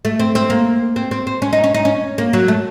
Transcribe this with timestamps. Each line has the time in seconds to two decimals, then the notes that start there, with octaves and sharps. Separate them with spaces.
0.05 A3
0.19 C4
0.35 C4
0.50 A#3
0.96 C4
1.11 C4
1.27 C4
1.42 C#4
1.53 D#4
1.64 C#4
1.74 D#4
1.85 C#4
2.18 A#3
2.33 F#3
2.48 A3